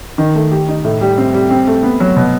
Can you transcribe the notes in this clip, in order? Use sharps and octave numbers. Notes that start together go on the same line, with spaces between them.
D#3
A3
G4
D#4
A2
G3
C4
G3
C4
A3
B3
F#3
B2